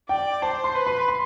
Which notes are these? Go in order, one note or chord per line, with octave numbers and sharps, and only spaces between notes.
D5 G5
C5 A5
C6
B4
C6
C6